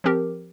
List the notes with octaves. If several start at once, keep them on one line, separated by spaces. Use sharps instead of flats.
F3 C4 G4 A#4